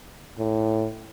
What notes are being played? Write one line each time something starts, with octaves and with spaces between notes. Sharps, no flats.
A2